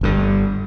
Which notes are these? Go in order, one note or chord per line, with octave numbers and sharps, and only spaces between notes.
G1 G2 D3